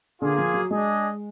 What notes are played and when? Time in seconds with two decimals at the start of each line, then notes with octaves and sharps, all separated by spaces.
0.21 D3 A#3 F4 G#4
0.38 F3
0.54 F#3
0.70 G#3 D4 G#4 D#5